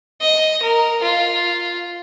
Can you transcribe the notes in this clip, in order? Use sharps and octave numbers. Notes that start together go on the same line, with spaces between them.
D#5
A#4
F4